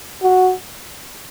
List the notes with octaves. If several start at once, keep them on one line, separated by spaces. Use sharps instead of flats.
F#4